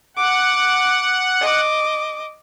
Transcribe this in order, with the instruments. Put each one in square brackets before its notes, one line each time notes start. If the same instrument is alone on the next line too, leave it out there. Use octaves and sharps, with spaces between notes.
[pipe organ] F#5 [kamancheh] D6
[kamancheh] D#5 D6